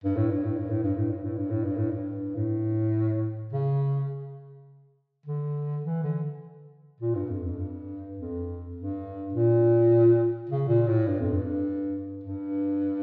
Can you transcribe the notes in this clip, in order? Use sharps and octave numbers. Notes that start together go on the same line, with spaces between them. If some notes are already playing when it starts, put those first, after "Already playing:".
G2
A2
G2
A2
G2
A2
G2
A2
G2
A2
G2
A2
G2
A2
G2
A2
C#3
D3
E3
D3
A#2
G2
F2
F2
G2
F2
G2
A#2
C#3
A#2
A2
G2
F2
G2
G2